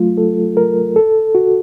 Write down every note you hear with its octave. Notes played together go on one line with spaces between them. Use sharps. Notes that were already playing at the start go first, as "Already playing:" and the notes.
Already playing: F#3 A3 F4
A4
A#4
A4
F#4